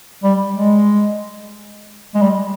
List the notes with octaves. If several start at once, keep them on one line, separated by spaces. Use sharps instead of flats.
G3
G#3
G#3
G3